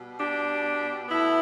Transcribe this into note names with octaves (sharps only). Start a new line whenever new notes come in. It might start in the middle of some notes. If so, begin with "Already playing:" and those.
Already playing: B2 G3
D4 G4
B2 A3 B3 E4